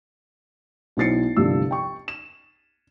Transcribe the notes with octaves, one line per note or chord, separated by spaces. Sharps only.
B1 E4 C5 A6 C7 C#7
G1 C2 G2 F3 E6
G5 C#6
E7